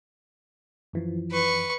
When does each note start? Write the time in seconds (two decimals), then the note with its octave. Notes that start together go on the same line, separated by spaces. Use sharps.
0.93 F#2 E3 F3
1.31 B4 C#6